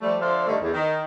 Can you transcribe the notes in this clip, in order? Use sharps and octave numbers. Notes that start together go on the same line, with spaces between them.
F3 G3 A3
D3 F3 C5 D5 E5 F5
G2 D3 D#3 G3 A3
E2
D#3